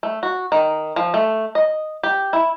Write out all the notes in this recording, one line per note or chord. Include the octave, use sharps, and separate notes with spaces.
A3
F#4
D#3
F3
A3
D#5
G4
E4